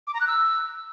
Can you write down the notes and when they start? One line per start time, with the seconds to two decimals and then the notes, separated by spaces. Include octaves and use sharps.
0.07 D6
0.14 A#5
0.21 F#6
0.27 E6